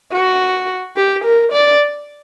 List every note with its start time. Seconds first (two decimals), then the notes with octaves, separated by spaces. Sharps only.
0.12 F#4
0.96 G4
1.24 A#4
1.52 D5